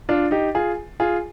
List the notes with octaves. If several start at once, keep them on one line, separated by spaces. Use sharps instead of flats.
D4 F4
D#4 G4
F4 G#4
F4 G#4